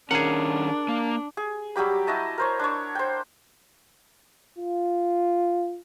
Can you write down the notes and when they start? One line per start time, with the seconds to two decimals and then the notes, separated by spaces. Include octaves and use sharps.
0.11 D#3 C#4 D4 G#4 A#4 F#5
0.88 A#3
1.37 G#4
1.76 F#3 G3 G4 B5
2.07 E4 F#4 D#5 A5
2.38 A#4 C5 C#5
2.59 D4 C#5
2.95 C5 G5
4.58 F4